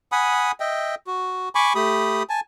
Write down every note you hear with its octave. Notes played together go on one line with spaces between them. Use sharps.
F#5 G#5 B5 D#6
D#5 E5 G5
F#4
G#5 B5 C#6 D6
A3 G4 B5 D#6
G#5 A5